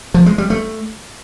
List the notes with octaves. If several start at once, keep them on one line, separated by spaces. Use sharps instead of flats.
F3
G#3
G3
A3